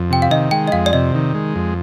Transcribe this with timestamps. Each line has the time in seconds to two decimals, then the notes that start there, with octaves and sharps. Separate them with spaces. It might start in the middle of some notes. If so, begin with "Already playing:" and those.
Already playing: F2
0.10 C3 G5
0.22 F5
0.31 D#3 D#5
0.51 G#3 G5
0.67 D#5
0.72 F2 F5
0.86 D5
0.93 C3 D#5
1.15 D#3
1.35 G#3
1.56 F2